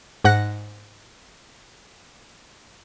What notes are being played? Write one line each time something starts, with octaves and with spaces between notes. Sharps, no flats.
G#2 F#5 F#6 A#6